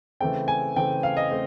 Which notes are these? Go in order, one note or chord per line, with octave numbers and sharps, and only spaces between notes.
C#3 E3 A3 C4 G5
G#5
C#3 E3 A3 C4 G5
F5
D#5
A3 C4